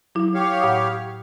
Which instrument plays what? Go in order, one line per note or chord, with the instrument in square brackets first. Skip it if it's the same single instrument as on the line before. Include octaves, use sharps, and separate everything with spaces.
[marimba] F#3 E4
[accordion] G4 C#5 F5
[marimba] A2 F#5 D#6